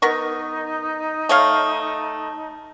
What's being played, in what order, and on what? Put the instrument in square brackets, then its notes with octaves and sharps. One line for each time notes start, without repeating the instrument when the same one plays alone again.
[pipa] B3 A#4 C#6 [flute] D#4
[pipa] A3 C#5 F5